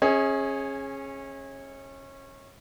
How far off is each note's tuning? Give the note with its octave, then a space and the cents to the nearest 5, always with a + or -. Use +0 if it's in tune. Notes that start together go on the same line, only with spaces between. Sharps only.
C#4 -25 G#4 +0 D#5 +40